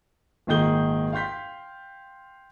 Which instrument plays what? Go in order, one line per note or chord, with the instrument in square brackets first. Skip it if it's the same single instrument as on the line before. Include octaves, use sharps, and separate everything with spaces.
[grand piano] G#1 A#2 D#3 G#4 G6 G7
F5 G5 C6 G6 B6